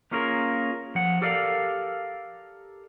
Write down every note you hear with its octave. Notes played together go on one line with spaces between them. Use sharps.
A#3 C#4 F4 G#4 A#4
F3 F#5
G4 A4 A#4 D5 F5